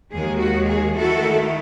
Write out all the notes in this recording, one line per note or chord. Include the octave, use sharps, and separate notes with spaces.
D#2 D#3 G#3 G#4
F#4
G#4
D#3 A3 E4 F#4 A4